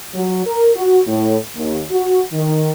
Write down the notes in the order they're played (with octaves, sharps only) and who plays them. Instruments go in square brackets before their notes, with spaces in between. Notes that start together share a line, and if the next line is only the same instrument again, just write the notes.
[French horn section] F#3
A#4
F#4
A2
D#2
F#4
D#3